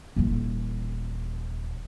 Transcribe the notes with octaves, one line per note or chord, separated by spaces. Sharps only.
D#1 E3